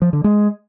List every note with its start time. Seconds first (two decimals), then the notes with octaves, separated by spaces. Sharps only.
0.02 F3
0.13 D3
0.24 G#3